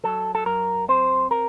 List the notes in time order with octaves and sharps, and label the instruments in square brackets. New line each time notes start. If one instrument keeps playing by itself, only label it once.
[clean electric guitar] F#3 A4
A4
F#2 A#4
C4 C5
A#4